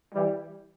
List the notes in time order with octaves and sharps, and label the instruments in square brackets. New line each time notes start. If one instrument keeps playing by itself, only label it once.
[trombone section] E3 G3